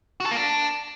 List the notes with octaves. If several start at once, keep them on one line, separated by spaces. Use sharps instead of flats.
F#4
A4
A#3
D4